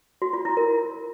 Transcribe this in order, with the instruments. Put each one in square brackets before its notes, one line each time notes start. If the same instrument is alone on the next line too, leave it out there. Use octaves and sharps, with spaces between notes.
[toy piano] F#4
F4
E4
A#4